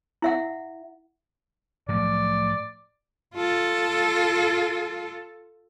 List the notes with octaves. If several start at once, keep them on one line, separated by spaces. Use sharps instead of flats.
E4 E5 F#5
A2 F3 F#3 D5
F4 A4